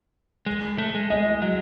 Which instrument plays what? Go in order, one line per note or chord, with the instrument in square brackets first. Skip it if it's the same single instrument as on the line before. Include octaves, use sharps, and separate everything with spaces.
[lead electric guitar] G#3
A3
G#3
[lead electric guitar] G#3 [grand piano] D#5
[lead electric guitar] F#3